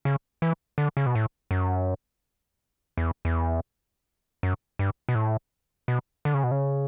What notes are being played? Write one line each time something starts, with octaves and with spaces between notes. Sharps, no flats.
C#3
E3
D3
C#3
B2
A2
F#2
E2
E2
F#2
G2
B2
A2
B2
D3
C#3
B2
C#3